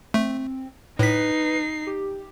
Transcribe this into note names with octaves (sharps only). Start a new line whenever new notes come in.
A3 C4
A2 D#4 B4 B6 C7
G4